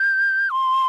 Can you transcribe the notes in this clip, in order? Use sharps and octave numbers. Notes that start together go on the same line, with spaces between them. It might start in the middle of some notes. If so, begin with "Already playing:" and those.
Already playing: G6
C6